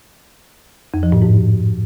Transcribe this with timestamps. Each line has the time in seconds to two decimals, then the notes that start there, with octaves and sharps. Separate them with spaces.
0.94 F2
1.03 F3
1.12 A2
1.22 G#2